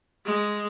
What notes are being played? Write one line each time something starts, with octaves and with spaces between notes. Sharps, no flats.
G#3